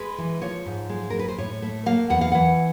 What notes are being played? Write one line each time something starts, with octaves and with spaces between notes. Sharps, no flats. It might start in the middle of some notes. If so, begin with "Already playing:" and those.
Already playing: G#3 B4
E3
F3 C#5
G#2
G#3
A#4
G#3
B4
C5
A2 C#5
A3
A#3 F5
E2 F#5
F5
E3 F#5